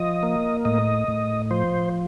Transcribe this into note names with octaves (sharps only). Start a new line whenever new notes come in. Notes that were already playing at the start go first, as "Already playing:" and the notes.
Already playing: F3 D#5
A#3
A2 D#5
A2
F3 C5